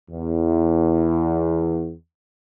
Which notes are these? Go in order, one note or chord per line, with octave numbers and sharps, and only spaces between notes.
E2 E3